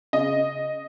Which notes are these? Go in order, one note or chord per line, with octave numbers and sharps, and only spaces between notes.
C#3 D#5